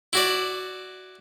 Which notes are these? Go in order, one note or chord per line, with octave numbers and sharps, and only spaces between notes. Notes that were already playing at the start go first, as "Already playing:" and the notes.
E4 F#4 D5